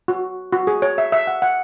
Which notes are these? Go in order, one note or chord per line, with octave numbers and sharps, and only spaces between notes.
F#4
F#4
G#4
C#5
E5
E5
F#5
F#5